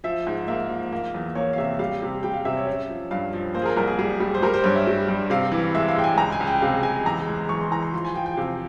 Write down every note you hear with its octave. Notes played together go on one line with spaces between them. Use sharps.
F3 E5
G#2
A#3 E5
F3
A#3
E2
A#3 C#5
F5
C3 E5
G3 F5
C3
G3 G5
F5
C3 E5
C#5
C#4 E5
F3
G2 F5
F3
A#3 C5
G#4
A#4
C2 A#4
G#4
G3 G#4
G3
C5
G3 A#4
C5
G2 C#5
E5
G3
G2
C3 F5
E3
G#3 E5
F5
G#3 G5
G#5
C#2 A#5
G#5
C#2
G5
C3 F5
C#2 G#5
E2 A#5
G#3
E2 C#6
C6
E3 A#5
C6
F3 C6
G#5
F3 G5
G5
C3 F5